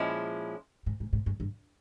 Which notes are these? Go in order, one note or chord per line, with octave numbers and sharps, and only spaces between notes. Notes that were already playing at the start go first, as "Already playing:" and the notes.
Already playing: A#2 F3 G#3 C#4 E4
G#2
G#2
G#2
G2
G2